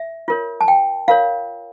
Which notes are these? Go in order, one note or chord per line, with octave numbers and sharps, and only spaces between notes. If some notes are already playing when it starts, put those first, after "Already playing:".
Already playing: E5
F4 A#4 C#5
A5
G5
F4 A#4 C#5 F5